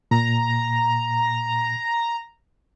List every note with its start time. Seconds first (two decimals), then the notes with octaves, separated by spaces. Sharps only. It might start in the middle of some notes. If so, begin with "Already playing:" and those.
0.11 A#2 A#5